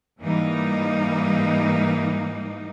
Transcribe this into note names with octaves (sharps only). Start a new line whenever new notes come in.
G#2 E3 G3 A#3 D#4